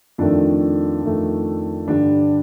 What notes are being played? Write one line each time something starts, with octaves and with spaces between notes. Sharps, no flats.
F2 D#3 A3 D4
F2 D#3 A3
G2 D3 G3 D4